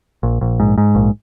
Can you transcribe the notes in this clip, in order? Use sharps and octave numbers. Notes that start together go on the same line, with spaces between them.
A#1
A#1
G#2
G#2
A#1